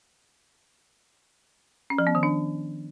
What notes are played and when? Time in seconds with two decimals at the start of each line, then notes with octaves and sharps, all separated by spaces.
1.90 C#4
1.98 F3
2.07 B3
2.15 D#3
2.23 D4